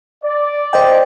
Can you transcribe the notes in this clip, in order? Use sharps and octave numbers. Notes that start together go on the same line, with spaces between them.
D5
C5 D#5 G5